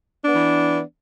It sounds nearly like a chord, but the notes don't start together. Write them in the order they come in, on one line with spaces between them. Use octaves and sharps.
D4 B3 E3